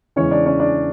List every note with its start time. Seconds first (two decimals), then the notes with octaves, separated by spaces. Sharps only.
0.16 E2 C#3 E3 G#3 C#4 C#5
0.31 D4 D5
0.46 C#4 C#5
0.60 D4 D5